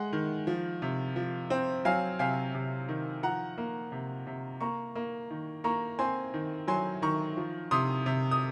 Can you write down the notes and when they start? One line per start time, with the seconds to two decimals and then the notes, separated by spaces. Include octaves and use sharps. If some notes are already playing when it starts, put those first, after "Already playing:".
Already playing: G#3 F#5
0.13 D#3
0.47 F3
0.82 C3
1.16 F3
1.50 C4
1.85 F#3 F5 G#5
2.19 C3 F5 G#5
2.54 C3
2.89 D#3
3.23 F3 F#5 A#5
3.58 A#3
3.92 C3
4.27 C3
4.61 A#3 A#5 C#6
4.95 A#3
5.30 D#3
5.64 A#3 A#5 C#6
5.99 C4 G#5 C6
6.34 D#3
6.68 F#3 G#5 C6
7.02 D#3 A#5 C#6
7.37 F3
7.71 C3 C6 D#6
8.06 C3
8.31 D#6